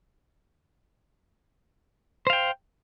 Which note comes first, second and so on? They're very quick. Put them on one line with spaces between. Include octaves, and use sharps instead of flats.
C5 F5 G5